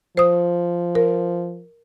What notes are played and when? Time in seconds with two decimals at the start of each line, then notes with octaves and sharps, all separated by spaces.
0.17 F3 C5 D#6
0.95 A#4